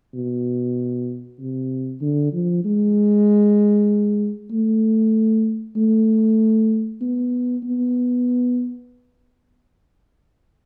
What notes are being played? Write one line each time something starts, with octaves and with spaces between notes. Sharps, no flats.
B2
C3
D3
F3
G#3
A3
A3
B3
B3